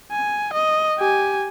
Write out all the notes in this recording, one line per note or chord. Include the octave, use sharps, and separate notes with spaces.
G#5
D#5
G4 G#5